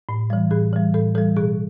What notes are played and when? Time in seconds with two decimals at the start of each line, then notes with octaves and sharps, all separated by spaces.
0.09 A2
0.30 E3 G3
0.51 A2 G#4
0.73 E3 G3
0.94 A2 A4
1.15 E3 A4
1.18 G3
1.37 B2 G#4